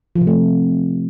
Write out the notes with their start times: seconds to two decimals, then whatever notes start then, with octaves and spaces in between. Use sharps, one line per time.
0.16 F3
0.21 C3
0.27 A3